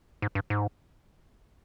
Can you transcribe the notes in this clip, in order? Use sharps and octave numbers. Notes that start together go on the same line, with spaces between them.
G#2
G2
G#2